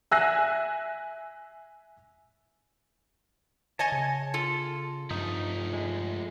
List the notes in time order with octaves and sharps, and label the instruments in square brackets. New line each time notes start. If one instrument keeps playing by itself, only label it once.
[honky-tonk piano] E5 G#5 E6 F#6 A#6 C7
[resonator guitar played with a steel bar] C#5 D#5 G#5 [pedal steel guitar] A5
[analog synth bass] C#3
[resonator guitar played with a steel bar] F4 A4
[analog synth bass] G2 [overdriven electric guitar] F3 A3 [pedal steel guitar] D#4
[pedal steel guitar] G#3